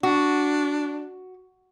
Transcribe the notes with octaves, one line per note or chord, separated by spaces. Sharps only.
D4 F#4